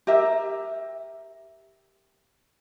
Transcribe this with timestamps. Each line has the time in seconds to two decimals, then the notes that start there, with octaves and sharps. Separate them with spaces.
0.07 G4 A#4 E5